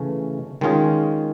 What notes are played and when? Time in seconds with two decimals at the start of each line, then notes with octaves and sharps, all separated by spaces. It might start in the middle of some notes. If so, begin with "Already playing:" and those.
Already playing: C#3 E3 A3 C#4
0.61 D#3 G#3 C#4 F4 G#4